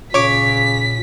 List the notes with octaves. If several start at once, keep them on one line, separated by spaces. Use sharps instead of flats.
A#2 C#3 C#5 D6 B6